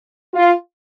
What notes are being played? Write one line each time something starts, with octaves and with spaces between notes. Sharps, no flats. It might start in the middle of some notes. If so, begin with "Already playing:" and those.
F4